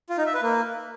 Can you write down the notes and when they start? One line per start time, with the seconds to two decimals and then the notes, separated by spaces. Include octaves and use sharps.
0.10 F4
0.18 D#4
0.26 E5
0.34 B4
0.42 A#3